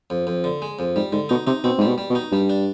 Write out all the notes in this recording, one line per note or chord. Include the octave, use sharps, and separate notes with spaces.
F2
F2
D3
G#3
F2
G#2 G3
G#2 D3
B2 D#4
C3 D#4
B2 C4
G#2 G3
B2
G3
B2
D#4
G2 G3
D4